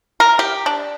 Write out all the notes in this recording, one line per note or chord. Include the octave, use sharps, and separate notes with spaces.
A#4
G4
D4